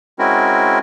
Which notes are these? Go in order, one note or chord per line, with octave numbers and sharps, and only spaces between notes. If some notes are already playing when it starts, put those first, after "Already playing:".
G#3 C4 C#4 E4 F#4 A#4